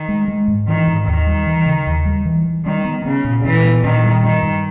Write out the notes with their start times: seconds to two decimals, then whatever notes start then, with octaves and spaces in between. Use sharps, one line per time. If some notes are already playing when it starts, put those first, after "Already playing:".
Already playing: D#3
0.09 G#3
0.28 G#3
0.48 G#2
0.68 D#3 E3
0.87 G#2
1.07 D#2 D#3
1.27 G3
1.47 E3
1.66 C#3
1.87 D#2
2.05 G3
2.25 E3
2.45 E3
2.65 D#3 G3
2.85 B3
3.05 C#3 B3
3.24 A#2
3.44 A#2 E3
3.64 B3
3.84 A#2 D#3
4.04 G3
4.24 G2 D#3
4.43 G2